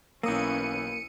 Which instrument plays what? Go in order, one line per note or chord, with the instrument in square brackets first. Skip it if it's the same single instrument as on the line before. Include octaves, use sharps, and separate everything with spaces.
[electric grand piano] B1 D#6 E6 [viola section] E3 C#4 [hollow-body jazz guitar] A#3 [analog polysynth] C#7 D#7